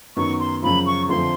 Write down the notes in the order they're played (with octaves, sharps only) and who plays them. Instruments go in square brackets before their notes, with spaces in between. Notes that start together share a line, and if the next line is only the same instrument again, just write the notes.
[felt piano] F#2 D#3 F#3 B3 D#4 [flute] C#6
[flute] C6
[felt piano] F#2 C#3 F3 [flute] B5
[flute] C#6
[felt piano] F2 D3 F3 A3 C4 [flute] C6